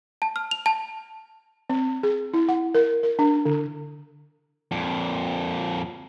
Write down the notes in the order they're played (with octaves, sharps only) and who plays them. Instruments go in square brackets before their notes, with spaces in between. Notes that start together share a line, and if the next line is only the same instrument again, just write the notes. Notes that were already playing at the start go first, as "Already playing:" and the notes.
[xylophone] A5
F6
F7
A5
[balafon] C4
G#4
E4
F#5
A#4
A#4
D4
D3
[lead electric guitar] F2 A#2